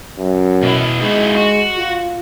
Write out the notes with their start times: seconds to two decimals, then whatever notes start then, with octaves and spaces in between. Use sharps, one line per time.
0.19 F#2
0.63 B2 B3 E4
1.02 G#3 D#4 E4 F#4
1.37 F#4
1.78 F4